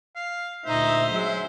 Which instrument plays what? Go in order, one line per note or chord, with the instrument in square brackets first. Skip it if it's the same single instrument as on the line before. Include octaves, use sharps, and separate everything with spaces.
[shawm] F5
[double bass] D2 A#2 [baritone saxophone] D#4 [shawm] C5 [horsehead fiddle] E5
[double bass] F#3 [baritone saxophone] G#3